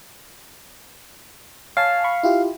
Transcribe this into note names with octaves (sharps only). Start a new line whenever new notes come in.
C#5 F5 G#5 A5
B5 C#6
E4 F4 G4